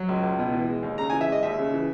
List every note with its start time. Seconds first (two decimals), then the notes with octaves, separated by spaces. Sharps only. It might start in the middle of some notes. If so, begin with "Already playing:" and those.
Already playing: F#3
0.09 C#2
0.23 C#2
0.39 B2
0.53 E3
0.69 G#3
0.83 D#2
0.98 C#3 A#5
1.10 G#5
1.13 E3
1.21 E5
1.28 G#3 D#5
1.43 D#2 E5
1.59 C#3
1.74 E3